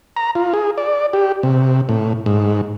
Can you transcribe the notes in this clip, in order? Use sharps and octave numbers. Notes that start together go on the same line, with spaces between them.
A#5
F4
G#4
D5
G4
C3
A2
G#2